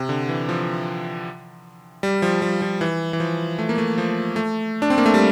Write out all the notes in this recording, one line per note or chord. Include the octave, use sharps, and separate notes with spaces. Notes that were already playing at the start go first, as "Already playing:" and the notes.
Already playing: C3
D3
E3
F3
G3
F3
G3
F3
E3
E3
F3
A3
A#3
A3
F3
A3
D4
C4
A#3
A3
G3